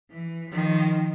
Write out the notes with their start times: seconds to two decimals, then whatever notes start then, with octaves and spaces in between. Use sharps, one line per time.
0.11 E3
0.50 D#3 F3